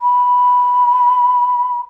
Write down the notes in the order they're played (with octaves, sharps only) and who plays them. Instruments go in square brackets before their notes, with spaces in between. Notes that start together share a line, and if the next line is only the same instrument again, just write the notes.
[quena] B5